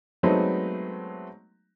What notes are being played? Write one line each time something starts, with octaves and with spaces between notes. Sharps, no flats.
F#3 G#3 A3 B3 C4 D#4